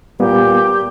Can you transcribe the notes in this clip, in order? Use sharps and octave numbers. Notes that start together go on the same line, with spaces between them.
A#2 G3 B3 G4